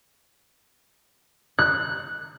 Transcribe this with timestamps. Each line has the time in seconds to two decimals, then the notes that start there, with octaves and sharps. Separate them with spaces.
1.59 F#6